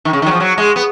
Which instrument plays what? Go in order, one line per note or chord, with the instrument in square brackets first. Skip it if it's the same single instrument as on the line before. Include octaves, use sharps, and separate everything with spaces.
[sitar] D#3
C#3
D#3
F#3
F3
F#3
G#3
B3